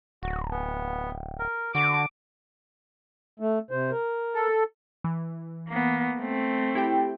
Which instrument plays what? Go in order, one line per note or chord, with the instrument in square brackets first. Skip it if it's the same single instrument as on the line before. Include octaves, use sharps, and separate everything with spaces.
[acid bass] D1 [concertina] F#4
[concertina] B3
A#4
[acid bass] D3 [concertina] F#4 [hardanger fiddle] D6
[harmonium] A3
C3 C5
A#4
[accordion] A4
[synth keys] E3
[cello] A#3 B3
A3 C4
[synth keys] E4 G4 G5